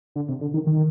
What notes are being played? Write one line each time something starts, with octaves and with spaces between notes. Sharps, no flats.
D3
C3
D3
D#3
D#3